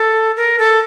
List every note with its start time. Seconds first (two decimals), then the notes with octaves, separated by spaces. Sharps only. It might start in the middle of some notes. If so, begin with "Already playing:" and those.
Already playing: A4
0.37 A#4
0.59 A4